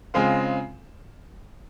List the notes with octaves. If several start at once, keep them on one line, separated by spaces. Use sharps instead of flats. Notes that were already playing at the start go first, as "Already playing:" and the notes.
C#3 G#3 C4 F4